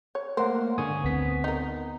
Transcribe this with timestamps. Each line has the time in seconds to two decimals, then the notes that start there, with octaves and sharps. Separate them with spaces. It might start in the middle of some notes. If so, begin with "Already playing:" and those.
0.15 C#5
0.37 A3 A#3 A#4 C5 F#5
0.78 G#2 D3 G#5 C#6 D#6
1.04 D2 B3 C4 B6
1.44 D#4 A#4